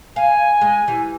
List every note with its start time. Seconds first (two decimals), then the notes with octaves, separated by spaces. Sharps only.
0.16 F5 G#5
0.61 G#3
0.88 E3 G4